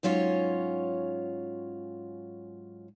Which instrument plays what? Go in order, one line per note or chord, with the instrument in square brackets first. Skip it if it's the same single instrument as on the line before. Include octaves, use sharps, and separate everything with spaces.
[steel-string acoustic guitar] G#2 F#3 C#4 F4 C#5